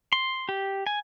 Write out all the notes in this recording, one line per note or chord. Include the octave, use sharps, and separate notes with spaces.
C6
G4
G#5